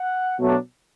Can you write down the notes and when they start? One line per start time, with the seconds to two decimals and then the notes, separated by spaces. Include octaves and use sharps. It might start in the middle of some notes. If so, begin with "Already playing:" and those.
Already playing: F#5
0.39 B2 F#3 A3 D4